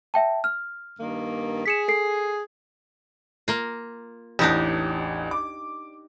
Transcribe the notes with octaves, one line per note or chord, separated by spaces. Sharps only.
E5 G5 A5
F6
G2 D#3 A#3
G#4 B6 C#7 E7
A4 C7
A#3 F4
A1 E2 D4 D#4 G4
D6